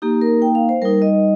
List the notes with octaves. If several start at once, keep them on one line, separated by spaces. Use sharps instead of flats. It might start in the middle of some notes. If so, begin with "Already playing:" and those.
A#3 D#4 G4
A#4
G5
F5
C5
G3 D#4 A#4
D#5